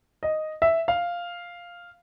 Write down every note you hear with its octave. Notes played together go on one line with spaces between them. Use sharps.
D#5
E5
F5